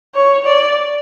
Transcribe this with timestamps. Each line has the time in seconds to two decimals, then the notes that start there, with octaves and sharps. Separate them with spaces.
0.15 C#5
0.46 D5